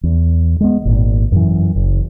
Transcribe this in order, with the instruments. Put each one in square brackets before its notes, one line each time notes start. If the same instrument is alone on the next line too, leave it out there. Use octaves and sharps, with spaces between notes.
[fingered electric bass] E2
G#3 B3
G#1 A#2
F#2 E3
F#1